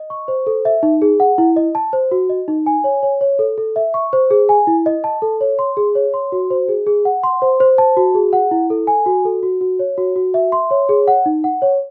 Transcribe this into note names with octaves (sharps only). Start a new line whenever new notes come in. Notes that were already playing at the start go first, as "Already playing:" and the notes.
Already playing: D#5
C#6
C5
A4
E5
D#4
G#4
F#5
E4
D#5
A5
C5
F#4
D#5
D#4
G#5
C#5
C#5
C#5
A4
A4
E5
C#6
C5
G#4
G#5
E4
D#5
A5
A4
C#5
C6
G#4
C#5
C6
F#4
C5
G#4
G#4
F#5
C6
C5
C5
A5
F#4
G#4
F#5
E4
A4
G#5
F#4
A4
F#4
F#4
C#5
F#4
F#4
E5
C6
C#5
G#4
F#5
D#4
F#5
C#5